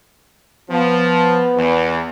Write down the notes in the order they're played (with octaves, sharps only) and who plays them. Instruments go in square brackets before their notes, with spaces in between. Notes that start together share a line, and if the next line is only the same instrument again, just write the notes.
[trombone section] F3 [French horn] B3
[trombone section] E2